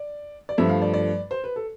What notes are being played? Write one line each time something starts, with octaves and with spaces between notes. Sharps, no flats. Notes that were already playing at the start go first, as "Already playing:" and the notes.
Already playing: D5
D5
G2 F3 A3 E5
F5
D5
D5
C5
B4
A4